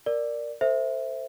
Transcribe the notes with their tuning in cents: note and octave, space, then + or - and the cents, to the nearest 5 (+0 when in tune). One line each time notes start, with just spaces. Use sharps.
A#4 +0 D5 +5
A4 +45 C5 +0 E5 +0